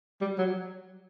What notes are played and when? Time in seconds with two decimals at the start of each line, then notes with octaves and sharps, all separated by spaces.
0.21 G3
0.38 F#3